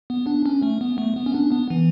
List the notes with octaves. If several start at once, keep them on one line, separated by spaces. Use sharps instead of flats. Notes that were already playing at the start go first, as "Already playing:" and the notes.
B3
D4
C#4
A3
B3
A3
B3
C#4
D4
B3
E3